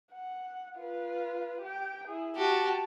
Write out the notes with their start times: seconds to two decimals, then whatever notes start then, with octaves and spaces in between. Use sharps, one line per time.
0.12 F#5
0.78 F4 B4
1.61 G4 G5
2.08 E4 G#4
2.36 F#4 G4 A5